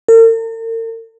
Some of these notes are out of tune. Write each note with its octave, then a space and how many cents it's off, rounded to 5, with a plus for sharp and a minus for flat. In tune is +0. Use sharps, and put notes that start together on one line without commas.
A#4 -45